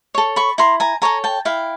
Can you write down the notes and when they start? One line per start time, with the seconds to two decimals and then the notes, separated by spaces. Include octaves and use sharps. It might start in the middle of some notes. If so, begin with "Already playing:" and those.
0.15 A4 C#5
0.36 B5 C#6
0.58 E4 A#5 C6
0.80 G#5 A#5
1.02 A4 C#5 G#5 A#5
1.24 G5 A5
1.45 E4 F5 G5